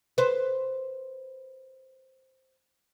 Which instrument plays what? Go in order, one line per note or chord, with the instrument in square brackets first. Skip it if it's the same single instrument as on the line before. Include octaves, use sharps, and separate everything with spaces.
[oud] B4 C5